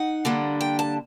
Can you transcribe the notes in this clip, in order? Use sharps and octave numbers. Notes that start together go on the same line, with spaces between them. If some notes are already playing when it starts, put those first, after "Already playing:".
Already playing: D#4 F#5
D3 G3 A#3 D4
G5
A5